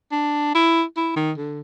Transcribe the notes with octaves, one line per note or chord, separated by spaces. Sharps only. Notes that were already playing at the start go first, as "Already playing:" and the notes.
D4
E4
E4
D#3
D3